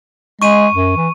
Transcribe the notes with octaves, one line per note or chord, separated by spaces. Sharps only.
G#3 C#6 D#7
F#2
E3